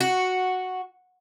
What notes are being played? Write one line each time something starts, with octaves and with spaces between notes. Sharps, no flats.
F#4